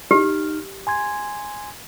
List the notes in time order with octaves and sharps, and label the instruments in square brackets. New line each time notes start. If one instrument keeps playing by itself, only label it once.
[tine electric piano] D#4 F6 [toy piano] G4
[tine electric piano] G#5 C6 G#6